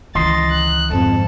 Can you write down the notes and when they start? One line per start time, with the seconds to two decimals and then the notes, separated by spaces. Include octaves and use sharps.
0.15 C#2 D#3 E3 D#5 C6 A6
0.52 F#6
0.91 F2 G#2 D#3 A4